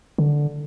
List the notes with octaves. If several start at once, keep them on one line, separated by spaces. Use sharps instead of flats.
D3